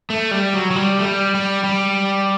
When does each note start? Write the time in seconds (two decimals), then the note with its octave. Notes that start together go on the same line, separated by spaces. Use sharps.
0.10 A3
0.31 G3
0.54 F#3
0.71 F#3
0.76 G3
0.99 A3
1.05 G3
1.35 G3
1.64 G3